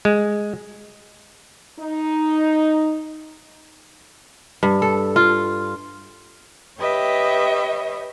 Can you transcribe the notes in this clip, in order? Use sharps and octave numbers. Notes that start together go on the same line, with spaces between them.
G#3
D#4
G2
A4
F4
G4 B4 C#5 D#5 E5 G5